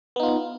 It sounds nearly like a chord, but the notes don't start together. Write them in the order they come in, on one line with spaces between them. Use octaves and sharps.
B3 D#4 F4